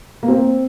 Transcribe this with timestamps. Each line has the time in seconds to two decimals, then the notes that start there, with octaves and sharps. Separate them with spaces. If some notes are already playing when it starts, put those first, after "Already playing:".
0.23 A#3
0.28 C4